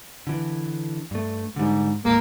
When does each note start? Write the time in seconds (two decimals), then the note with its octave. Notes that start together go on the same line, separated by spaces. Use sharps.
0.27 D3 E3
1.11 G2 A3
1.56 G#2 D3 G3
2.05 D1 G#1 G#3 A#3